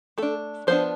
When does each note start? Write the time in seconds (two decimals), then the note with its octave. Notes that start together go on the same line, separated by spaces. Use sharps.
0.18 A3 D4 A4
0.67 F3 B3 D4 C5